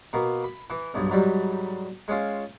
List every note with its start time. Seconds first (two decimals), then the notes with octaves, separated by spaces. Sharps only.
0.13 B2 A#3
0.44 B5
0.70 E3
0.94 B1 G2
1.10 G#2 F#3 G3
2.08 G#3 C#4 F4